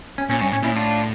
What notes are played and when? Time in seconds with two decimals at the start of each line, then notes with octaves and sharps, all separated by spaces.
0.18 C#4
0.29 A#2 C#4
0.41 G2 C#4
0.52 A2 C#4
0.62 A#2 C#4 E4
0.72 A2 D4 F4